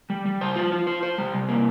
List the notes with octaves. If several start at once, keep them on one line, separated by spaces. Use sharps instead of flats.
G3
G3
C5
F4
F4
C5
C5
G3
C3
A#3